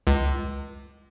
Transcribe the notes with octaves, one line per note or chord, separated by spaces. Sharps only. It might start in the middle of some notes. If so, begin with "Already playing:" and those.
C#2